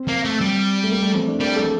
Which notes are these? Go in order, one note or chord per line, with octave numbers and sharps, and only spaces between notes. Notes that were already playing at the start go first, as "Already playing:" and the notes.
Already playing: C4
A#3
A3
G3
A3
A#3
A3
C4
D4
G3 A#3
A4